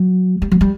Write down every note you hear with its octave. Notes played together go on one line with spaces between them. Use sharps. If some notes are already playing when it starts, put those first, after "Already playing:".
Already playing: F#3
G3
F#3
G3